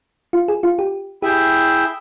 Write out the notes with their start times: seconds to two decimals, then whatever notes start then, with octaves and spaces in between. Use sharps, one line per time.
0.33 F4
0.48 G#4
0.63 F4
0.79 G4
1.22 E4 G4 G#4 E5 G5